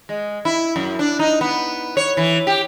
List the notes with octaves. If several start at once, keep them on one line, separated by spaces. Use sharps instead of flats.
G#3
E4
F#2
D4
D#4
B3
C#5
E3
G4